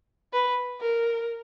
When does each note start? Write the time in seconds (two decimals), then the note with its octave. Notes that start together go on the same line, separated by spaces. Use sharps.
0.33 B4
0.81 A#4